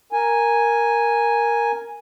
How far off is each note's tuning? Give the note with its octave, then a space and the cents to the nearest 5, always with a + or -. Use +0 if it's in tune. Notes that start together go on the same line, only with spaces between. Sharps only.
A#4 +0 G#5 +0